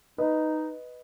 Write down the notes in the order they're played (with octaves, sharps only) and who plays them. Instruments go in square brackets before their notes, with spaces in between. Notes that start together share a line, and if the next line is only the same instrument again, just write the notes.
[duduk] D#4 [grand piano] B4 D#5